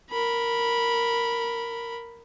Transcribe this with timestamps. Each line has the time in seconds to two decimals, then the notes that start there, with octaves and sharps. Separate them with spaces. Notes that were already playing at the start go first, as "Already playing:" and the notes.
0.10 A#4 B5